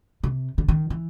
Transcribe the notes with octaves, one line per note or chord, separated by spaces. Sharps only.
C3
D3
D#3
E3